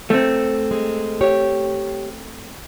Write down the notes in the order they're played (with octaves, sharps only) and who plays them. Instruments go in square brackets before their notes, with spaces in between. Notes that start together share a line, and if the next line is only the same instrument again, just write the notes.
[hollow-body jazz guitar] A3 C4
[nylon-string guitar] G#3
G4 C#5